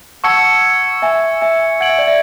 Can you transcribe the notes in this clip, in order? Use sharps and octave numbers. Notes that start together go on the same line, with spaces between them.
F#5 A5 C#6 E6 G#6 C#7
E5 G#5
E5 G#5
F#5 G#6 D7 F#7
E5
D5
E5